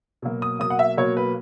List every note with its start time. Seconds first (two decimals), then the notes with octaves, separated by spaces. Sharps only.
0.22 B2 F#3 A#3
0.42 D#6
0.60 B2 F#3 A#3 D#6
0.70 F#5
0.79 E5
0.97 B2 F#3 A#3 C#5
1.17 B4